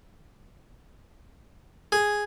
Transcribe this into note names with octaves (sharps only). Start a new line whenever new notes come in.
G#4